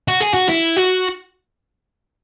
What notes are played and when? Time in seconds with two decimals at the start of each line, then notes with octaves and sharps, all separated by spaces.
0.08 F#4
0.21 G#4
0.34 F#4
0.49 E4
0.77 F#4